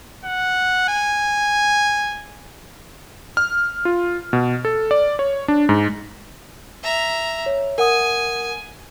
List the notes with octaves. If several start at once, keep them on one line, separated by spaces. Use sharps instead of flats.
F#5
G#5
F6
F4
B2
A4
D5
C#5
D4
G#2
E5 A#5
C#5
A#4 F#5 G#5 D#6